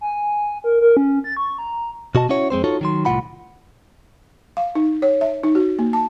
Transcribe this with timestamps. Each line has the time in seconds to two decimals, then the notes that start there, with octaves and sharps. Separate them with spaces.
0.01 G#5
0.64 A#4
0.81 A#4
0.97 C#4
1.24 A6
1.37 C#6
1.58 A#5
2.15 B2 F#4 D#5 A5
2.29 C#4 E4 F#4 C#5
2.50 F2 G#3 C4 C5
2.64 D#4 F4 F#4 A4 C#5
2.81 D#3 F#3 C6
3.05 C2 A2 C3 F4 F#5 B5
4.57 F5
4.75 D#4
5.02 C#5
5.21 E5
5.43 D#4
5.55 F#4
5.79 A#3
5.93 A5